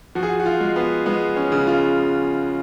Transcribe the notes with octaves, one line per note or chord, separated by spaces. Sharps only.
F3 F#4
G#4
F#4
F#4
F4
G#3
B3
G#3 B3
C#4
C#3
F4